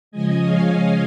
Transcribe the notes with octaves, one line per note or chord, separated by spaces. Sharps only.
C#3 F3 G#3 D#5 G#5
C#5 F5